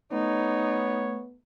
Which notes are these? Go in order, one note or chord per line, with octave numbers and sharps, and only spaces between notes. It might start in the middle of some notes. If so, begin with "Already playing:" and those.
A3 B3 D#4 C#5